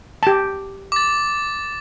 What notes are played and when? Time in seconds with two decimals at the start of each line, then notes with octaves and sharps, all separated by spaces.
0.23 G4 A5
0.92 D6 A6